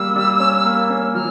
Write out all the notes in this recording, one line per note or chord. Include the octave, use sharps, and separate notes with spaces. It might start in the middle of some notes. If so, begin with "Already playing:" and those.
Already playing: G3 A#3 E6
G3
C#4
A#3
C#4
F#3 F6